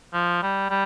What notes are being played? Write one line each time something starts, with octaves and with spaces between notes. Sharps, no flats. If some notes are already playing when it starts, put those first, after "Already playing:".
F3
G3
G3